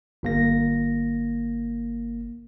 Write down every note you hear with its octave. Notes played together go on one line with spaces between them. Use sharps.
G1 A#3 A#6